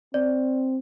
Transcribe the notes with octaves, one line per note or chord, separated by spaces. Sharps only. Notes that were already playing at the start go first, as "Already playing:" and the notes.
C4 D5